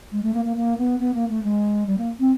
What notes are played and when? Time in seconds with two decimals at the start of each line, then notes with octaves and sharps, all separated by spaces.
0.12 G#3
0.23 A3
0.34 A#3
0.45 A#3
0.57 A#3
0.78 B3
1.00 B3
1.14 A#3
1.29 A3
1.43 G#3
1.87 G3
1.98 A#3
2.20 C4